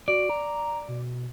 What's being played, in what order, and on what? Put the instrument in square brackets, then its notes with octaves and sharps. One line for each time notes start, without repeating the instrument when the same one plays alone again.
[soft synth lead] F#4 [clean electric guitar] D5
[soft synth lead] A#5
B2